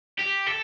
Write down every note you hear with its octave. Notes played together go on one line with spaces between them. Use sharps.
G4
A4